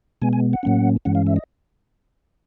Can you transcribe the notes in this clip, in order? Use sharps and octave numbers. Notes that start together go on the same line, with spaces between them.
B2 G#3 B3 G#5
G#5
F#5
A2 F#3 A#3 C#4
G2 E3 G#3 C#4 F#5
F5
E5
D#5